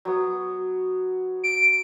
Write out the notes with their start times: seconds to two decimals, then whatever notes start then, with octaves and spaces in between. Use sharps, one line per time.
0.05 F#3 B3
1.44 D7